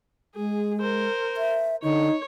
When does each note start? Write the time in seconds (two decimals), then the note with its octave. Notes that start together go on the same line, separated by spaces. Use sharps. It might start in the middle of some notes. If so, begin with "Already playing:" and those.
0.36 G#3 G#4
0.81 A#4 C5
1.37 E5
1.84 D3 D#4 C#5